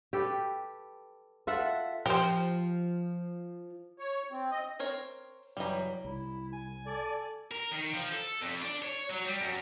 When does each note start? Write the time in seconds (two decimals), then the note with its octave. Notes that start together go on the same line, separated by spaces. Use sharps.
0.13 G4 A4 B4
1.47 F4 A4 E5 F#5
2.06 F3 G4 C5
3.99 C#5
4.32 C4
4.51 D#5
4.79 C4 A#4 C#5
5.57 F#1 E3 G3 D#5 A#5
6.05 C2 E4
6.52 G#5
6.86 A4 D5
7.51 A#4
7.71 D#3
7.94 F3
8.12 A4
8.42 F2
8.62 D4
8.82 C#5
9.10 F#3
9.25 G3
9.41 F#2